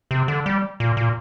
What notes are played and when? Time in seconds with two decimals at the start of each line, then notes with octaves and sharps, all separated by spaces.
0.11 C3
0.28 D3
0.46 G3
0.80 A#2
0.97 A#2